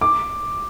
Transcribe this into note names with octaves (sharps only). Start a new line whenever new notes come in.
D6